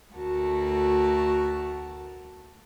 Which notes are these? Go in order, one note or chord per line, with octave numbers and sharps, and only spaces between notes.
D2 A3 F#4 A#4 A5